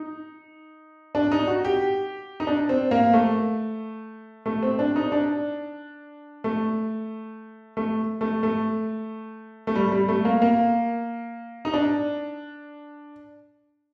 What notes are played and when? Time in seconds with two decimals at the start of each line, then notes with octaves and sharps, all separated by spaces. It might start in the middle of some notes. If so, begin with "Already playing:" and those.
Already playing: D#4
1.15 D4
1.32 D#4
1.48 F#4
1.64 G4
2.40 D#4
2.47 D4
2.69 C4
2.91 A#3
3.13 A3
4.46 A3
4.63 C4
4.79 D4
4.96 D#4
5.12 D4
6.44 A3
7.77 A3
8.21 A3
8.43 A3
9.67 A3
9.75 G3
9.92 G3
10.08 A3
10.25 A#3
10.42 A#3
11.65 D#4
11.74 D4